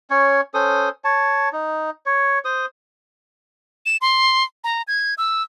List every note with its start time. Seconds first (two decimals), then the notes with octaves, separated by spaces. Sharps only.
0.10 C#4 C#5
0.54 C#4 A4 C5 D#6
1.04 C#5 A5
1.53 D#4
2.06 C#5
2.45 C5 D#6
3.86 E7
4.01 C6
4.64 A#5
4.88 G#6
5.18 E6